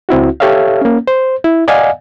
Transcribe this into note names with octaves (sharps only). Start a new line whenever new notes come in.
C#2 C4 E4 F#4
G4 A4 C#5 E5 F5
A#3 C#4
C5
E4
D5 D#5 F5 F#5 G#5